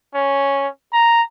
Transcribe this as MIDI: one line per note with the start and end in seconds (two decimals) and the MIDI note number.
0.15 0.67 61
0.93 1.22 82